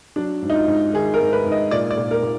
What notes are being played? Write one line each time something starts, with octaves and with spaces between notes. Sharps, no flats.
F#3 D4
G#2
D#4
F4
G#2
D#3 G#4
A#4
G#2
B4
G#2
D#5
A#2 D5
D5
A#2
A#4
A#2